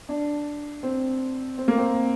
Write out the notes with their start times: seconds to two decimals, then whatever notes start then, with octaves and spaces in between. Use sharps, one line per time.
0.09 D4
0.83 C4
1.58 C4
1.68 A#3
1.78 C4